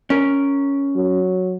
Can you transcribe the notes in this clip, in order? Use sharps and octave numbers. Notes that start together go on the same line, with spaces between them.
C#4 A#4
F#3